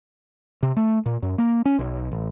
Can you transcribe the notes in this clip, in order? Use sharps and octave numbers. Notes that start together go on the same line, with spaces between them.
C3
A3
A#2
F#2
A#3
C#4
B1
A1